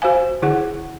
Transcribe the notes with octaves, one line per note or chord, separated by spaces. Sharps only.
F#4 C5 F5 G#5
D3 E4 G#4 F#5